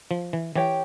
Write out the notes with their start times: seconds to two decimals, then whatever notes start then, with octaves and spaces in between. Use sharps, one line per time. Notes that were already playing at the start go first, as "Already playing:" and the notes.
0.11 F3
0.33 E3
0.56 E3 G4 C#5 G5